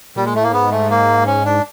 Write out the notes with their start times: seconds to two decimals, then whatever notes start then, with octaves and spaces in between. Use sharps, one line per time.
0.16 A#2 G3
0.25 G#3
0.34 A2 A3
0.43 A#3
0.53 G#2 B3
0.71 A3
0.90 A#3
1.27 C#4
1.45 D4